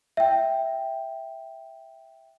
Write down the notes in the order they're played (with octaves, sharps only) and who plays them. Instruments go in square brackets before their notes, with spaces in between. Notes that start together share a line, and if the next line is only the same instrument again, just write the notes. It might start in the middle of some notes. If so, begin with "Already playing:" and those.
[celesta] E5 G5